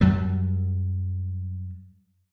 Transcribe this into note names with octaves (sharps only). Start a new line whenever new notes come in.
F#2 F#3 G3